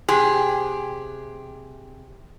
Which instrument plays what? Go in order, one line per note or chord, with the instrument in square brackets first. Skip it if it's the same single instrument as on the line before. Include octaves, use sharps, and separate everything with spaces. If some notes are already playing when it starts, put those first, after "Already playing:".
[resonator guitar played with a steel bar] C3 G4 G#4